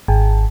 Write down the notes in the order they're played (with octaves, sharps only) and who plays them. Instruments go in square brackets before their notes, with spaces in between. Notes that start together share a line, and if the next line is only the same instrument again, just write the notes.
[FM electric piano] G#1